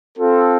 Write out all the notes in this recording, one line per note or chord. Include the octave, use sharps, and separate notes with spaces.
C4 F4 A4